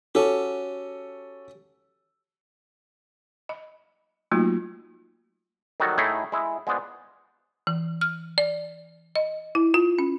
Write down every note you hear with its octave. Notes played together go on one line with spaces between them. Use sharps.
C#4 F#4 G4 A4
D#5
F#3 A3 A#3 D#4 F4 F#4
D#3 F#3 G3 F#4 A4
A2 A3 D#4 E4 G#4
G#3 E4
G#3 B3 F4 C5 D5
E3
F6
D5
D#5
E4
F4
C#4